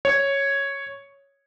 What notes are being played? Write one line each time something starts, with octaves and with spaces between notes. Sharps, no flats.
C#5